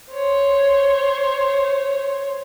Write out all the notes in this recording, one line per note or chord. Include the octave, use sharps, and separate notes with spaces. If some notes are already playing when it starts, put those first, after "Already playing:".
C5 C#5